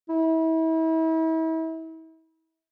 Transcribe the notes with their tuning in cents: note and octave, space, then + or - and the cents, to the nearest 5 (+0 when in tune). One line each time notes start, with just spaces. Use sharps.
E4 -35